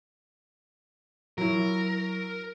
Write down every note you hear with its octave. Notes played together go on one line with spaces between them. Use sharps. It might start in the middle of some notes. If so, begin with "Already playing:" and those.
F#3 E4 A#4